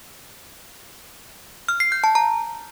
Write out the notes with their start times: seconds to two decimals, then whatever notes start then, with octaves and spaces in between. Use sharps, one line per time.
1.69 F6
1.80 C7
1.92 G6
2.04 A5
2.15 A#5